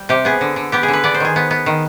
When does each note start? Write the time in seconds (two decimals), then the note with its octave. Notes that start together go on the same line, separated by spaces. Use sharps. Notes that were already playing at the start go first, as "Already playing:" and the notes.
Already playing: G3
0.09 C3 G4
0.25 B3 G#4
0.41 D3
0.56 D3
0.72 B3 G4
0.83 G#4
0.88 D3
0.93 B4
1.04 B3 D5
1.14 C5
1.20 D#3 G#4
1.36 B3
1.51 B3
1.66 D#3